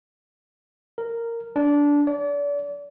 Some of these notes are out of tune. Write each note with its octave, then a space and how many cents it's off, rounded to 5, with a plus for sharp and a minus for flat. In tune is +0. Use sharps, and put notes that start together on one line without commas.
A#4 -10
D4 -15
D5 -35